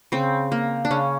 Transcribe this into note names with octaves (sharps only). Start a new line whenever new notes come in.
C#3 C4
A#3
D4
C#3 C#4